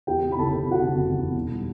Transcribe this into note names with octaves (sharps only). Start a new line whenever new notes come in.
E2 G4 G5
C3
B5
F#1 A4 A5
C3
C3 F#4 F#5
F#1
F#1
E2
B1
G3